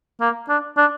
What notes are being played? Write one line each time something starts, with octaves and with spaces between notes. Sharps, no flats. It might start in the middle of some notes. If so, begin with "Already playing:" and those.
A#3
D4
D4